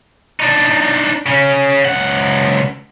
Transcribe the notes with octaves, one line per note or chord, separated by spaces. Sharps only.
D4 D#4
C#3 C#4
C#2 F#5